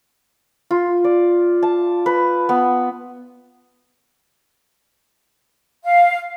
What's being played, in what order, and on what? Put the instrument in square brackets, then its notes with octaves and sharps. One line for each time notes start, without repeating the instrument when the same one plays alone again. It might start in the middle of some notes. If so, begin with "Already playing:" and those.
[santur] F4
D5
A5
B4
B3
[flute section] F5